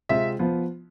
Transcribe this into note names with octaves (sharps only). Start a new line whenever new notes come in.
C3 G#3 C4 F4 E5
F3 B3 F4